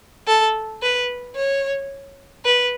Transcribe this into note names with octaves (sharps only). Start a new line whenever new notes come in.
A4
B4
C#5
B4